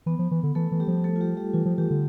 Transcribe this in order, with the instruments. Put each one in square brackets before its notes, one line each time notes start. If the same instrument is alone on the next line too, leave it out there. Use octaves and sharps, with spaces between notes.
[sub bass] E3 [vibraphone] B3
[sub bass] F3
E3
D3
[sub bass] E3 [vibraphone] A3 A4
[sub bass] E3
[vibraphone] G3 G4
[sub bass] F3
[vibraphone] A3 A4
F4
G3 G4
G3 G4
[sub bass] E3 [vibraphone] F4
[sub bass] F3
[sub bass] E3 [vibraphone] G3 G4
[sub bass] D3